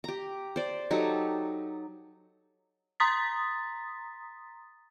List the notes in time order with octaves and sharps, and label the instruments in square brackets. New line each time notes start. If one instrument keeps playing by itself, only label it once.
[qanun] G4 A#5
C5 D5
F#3 D#4 G4 A4
[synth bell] A#5 C6 D#6 A6 B6